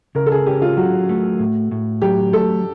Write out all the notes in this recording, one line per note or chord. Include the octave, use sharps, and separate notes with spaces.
C#3 A#4
A4
G#4
C#4 G4
F4
F#3 F#4
A3
A2
A2
F#3 G4
A3 A4